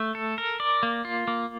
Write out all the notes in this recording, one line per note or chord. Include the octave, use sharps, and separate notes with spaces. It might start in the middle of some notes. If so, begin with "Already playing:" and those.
Already playing: A3
A4
A#4
D5
A#3
F4
A#3